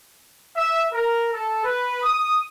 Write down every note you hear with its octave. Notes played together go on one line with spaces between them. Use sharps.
E5
A#4
A4
B4
D#6